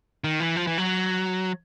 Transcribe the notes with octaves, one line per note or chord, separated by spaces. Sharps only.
D#3
E3
F3
E3
F#3